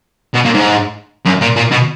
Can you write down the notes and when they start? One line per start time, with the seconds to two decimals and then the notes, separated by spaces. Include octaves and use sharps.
0.34 B2
0.45 A#2
0.54 G#2
1.26 F#2
1.41 A#2
1.56 A#2
1.71 B2